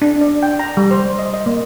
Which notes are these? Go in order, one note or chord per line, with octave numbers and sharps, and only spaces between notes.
D4
D5
G5
A#5
G3
C5
D#5
D#5
A#3